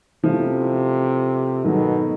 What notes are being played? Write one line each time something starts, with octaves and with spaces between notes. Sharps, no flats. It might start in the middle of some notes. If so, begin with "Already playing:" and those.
C3 F3 A3 C#4 E4 A4
G#2 B2 D#3 F#3 A3